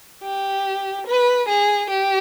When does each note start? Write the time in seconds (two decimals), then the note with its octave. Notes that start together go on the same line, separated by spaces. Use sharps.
0.24 G4
1.07 B4
1.49 G#4
1.90 G4